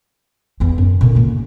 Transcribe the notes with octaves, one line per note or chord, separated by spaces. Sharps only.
E2 B3
F#2
A#2 D3
A#3 C#4
D#2